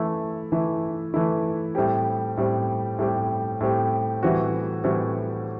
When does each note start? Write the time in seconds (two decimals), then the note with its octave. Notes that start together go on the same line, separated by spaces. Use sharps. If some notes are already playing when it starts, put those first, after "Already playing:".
Already playing: E3 A3 E4
0.52 E3 A3 E4
1.14 E3 A3 E4
1.75 A2 G3 C4 G4
2.37 A2 G3 C4 G4
2.99 A2 G3 C4 G4
3.61 A2 G3 C4 G4
4.23 A2 E3 G3 C4 F#4
4.84 A2 E3 G3 C4 F#4